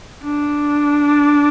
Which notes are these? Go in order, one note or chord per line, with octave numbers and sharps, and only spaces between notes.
D4